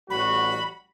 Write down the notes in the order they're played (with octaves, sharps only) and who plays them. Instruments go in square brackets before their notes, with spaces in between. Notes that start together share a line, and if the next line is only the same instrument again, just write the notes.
[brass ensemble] A1 G3 F#4 [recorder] B5